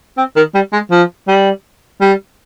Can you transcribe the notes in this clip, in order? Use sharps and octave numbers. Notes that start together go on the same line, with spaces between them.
C4
D#3
G3
G#3
F3
G3
G3